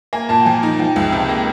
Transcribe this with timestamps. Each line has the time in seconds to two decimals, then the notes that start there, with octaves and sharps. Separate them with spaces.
0.13 A#3 G#5
0.29 A#2 A5
0.41 G5
0.45 F3 G#5
0.63 D#4
0.79 F3 G5
0.96 C#2
1.12 C3
1.29 A#3